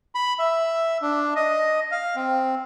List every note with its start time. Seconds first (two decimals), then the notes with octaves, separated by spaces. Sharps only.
0.15 B5
0.39 E5
1.02 D4
1.36 D#5
1.92 F5
2.16 C4